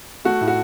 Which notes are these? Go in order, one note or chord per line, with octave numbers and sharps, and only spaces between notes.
A3 F#4
A2
F#4